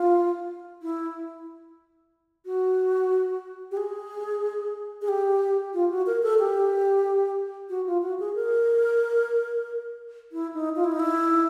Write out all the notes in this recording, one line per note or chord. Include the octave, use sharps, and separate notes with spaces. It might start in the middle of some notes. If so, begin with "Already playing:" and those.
Already playing: F4
E4
F#4
G4
G#4
G#4
G4
F4
F#4
A#4
A4
G4
F#4
F4
F#4
G#4
A#4
E4
D#4
F4
E4
D#4
E4